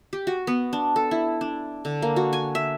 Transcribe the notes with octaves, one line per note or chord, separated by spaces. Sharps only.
G4
F#4
B3
D4
A4
E4
D4
D3
A#3
F#4
G#5
E5